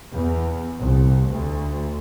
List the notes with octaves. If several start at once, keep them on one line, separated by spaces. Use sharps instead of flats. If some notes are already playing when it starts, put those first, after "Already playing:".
E2
C2
D2